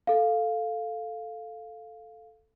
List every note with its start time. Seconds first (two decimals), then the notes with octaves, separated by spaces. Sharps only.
0.07 A4 F5